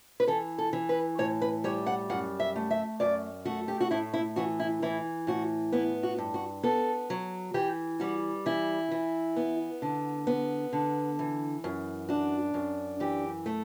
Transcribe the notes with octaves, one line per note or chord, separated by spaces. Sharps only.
B4
E3 A4
A4
E3
B4
A2 C#5
B4
G3 C#5
F#5
F#2 F#5
E5
A3
E5
F#2 D5
A3 F#4
G4
F#4
A2 E4
E4
E3 F#4
E4
E3 E4
A2 F#4
B3 E4
F#4
G2
F#4
B3 A4
F#3
E3 G4
G3 F#4
E3 E4
E3
B3
D3
B3
D3
E3
F#2
D4 F#4
F#2
E3 G4
A3